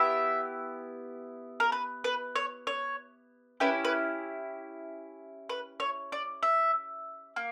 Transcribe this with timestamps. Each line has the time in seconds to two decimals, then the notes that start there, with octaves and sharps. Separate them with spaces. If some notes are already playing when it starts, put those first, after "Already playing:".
Already playing: B3 E4 G4 E5
1.60 A#4
1.72 B4
2.04 B4
2.36 C#5
2.67 C#5
3.60 C#4 E4 G4 B4
3.85 B4
5.49 B4
5.80 C#5
6.12 D5
6.43 E5
7.36 A#3